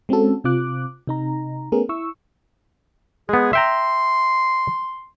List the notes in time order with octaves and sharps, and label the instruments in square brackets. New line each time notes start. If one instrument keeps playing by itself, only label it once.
[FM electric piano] G#3 C4 C#4 F#4 A4
C3 C4 F4 D6 F#6
C3 D#4 A#5
A3 B3 C#4 G#4 A#4
E4 C#6 E6
[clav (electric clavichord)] G#3 B3 [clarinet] G#4
[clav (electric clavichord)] E5 G5 A#5 [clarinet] C6